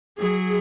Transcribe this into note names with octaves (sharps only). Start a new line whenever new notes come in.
F#3 G#4